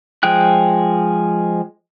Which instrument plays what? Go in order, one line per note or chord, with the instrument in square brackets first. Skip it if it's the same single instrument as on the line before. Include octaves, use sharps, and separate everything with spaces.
[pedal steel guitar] F3 G#3 G#4 G5 F#6